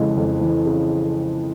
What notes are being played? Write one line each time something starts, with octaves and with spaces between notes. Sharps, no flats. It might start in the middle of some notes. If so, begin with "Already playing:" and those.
Already playing: F2 C#3 E3 G#3
F2
E3
C#3